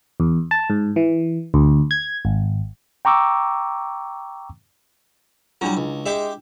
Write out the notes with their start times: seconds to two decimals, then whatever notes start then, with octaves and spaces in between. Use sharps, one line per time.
0.20 E2
0.51 A5
0.70 G#2
0.96 E3
1.54 D2
1.91 G#6
2.25 G#1
3.05 G5 A#5 C#6 D6 E6
5.61 F#3 G3 D4 E4 F4
5.77 C#2
6.06 G#3 G4 E5